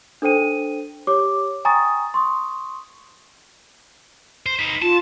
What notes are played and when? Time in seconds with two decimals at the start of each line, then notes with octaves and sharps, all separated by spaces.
0.22 D4 A4 C5 G5 D#7
1.07 G4 C#5 D6
1.65 G5 G#5 A#5 C#6 D#6 A6
2.14 C6 C#6 D#6
4.46 C5
4.59 D#4 B4
4.82 F4 A5